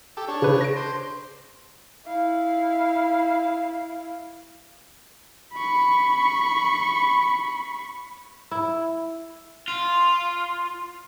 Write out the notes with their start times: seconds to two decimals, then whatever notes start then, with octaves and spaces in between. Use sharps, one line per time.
0.17 G4 A4
0.28 D4 C#5
0.42 C#3 B4
0.61 A#6 D7
0.76 C5
2.06 E4 F5
5.53 B5 C#6
8.51 E4
9.68 F4